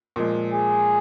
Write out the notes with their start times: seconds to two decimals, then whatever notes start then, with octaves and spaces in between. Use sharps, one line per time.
0.16 A#2 F3 G#3
0.54 G#4